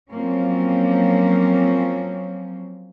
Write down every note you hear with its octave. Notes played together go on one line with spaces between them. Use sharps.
F3 F#3 A#3 C4 C#4